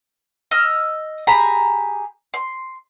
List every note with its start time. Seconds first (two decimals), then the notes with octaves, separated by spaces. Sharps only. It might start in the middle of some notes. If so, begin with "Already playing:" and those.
0.51 D#5 E6 F6
1.27 G4 G#4 A#5 B5
2.34 C6